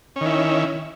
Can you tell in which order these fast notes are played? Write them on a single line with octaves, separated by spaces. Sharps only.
C#4 D#3 E4